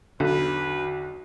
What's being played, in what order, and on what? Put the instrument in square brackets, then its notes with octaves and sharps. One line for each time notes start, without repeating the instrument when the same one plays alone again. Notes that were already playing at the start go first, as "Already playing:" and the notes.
[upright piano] B1 E2 [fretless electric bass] D3 [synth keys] F#4 [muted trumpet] B4